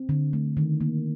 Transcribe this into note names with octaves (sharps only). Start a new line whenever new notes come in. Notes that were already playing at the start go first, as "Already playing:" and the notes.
Already playing: C4
D3
A3
D#3
A#3